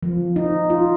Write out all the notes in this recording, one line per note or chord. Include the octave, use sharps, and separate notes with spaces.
F3
D#4
F4